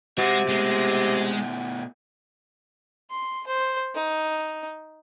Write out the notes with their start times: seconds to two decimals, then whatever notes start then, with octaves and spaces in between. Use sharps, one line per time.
0.18 C3 G#3 F#4
0.48 B2 G#3 A3
3.10 C6
3.47 C5
3.95 D#4